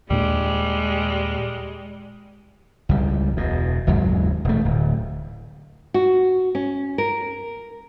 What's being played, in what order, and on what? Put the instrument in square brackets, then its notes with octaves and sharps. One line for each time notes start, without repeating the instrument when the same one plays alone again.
[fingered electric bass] D#2 A#2 D4 [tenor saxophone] G3 [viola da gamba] G#3
[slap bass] C#2 G3
E1 B2
F#1 D#2 G#2 F#3
E1 A3
D1
[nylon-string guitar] F#4
C#4
A#4